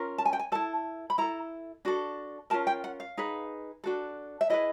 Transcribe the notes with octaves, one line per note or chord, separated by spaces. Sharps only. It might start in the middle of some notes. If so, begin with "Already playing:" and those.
Already playing: C#4 F4 A#4
A5
G#5
G5
G#5
E4 A4 A5
B5
E4 A4 A#5
D4 F#4 A4
C#4 F4 A#4 A5
G5
F#5
F5
D#4 G#4 B4
D4 F#4 A4
E5
E4 G#4 B4 D#5